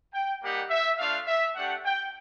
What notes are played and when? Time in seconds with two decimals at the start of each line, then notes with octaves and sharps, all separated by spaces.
0.13 G5
0.42 G3 A#3 D#4 G4 F#5
0.70 E5
0.98 A3 D4 F4 F5
1.26 E5
1.56 A3 D4 G4 F#5
1.85 G5